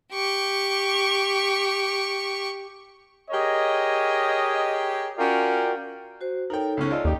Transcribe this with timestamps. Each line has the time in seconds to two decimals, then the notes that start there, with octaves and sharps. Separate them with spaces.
0.12 G4 C#6
3.31 G4 G#4 A#4 C#5 D#5
5.18 C#4 F4 F#4 A#4 D5 G5
6.21 F#4 C5
6.50 D#4 A4 A#4 C#5 G5
6.77 C#2 C#3 C#4
6.91 F4 A4 D5 D#5
7.05 D#2 D#4 G4